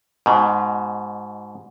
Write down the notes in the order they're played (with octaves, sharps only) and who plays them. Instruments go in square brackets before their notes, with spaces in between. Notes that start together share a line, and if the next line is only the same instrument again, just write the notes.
[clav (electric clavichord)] G#2 B2